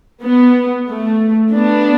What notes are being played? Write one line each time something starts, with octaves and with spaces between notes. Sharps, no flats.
B3
A3
B3 D4